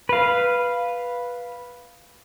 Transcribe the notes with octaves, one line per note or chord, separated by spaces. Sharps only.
B4 F5